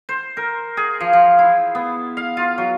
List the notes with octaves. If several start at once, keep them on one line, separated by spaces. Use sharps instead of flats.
C5
A#4
G#4
F3
F3
E4
B3
F5
F4
F#3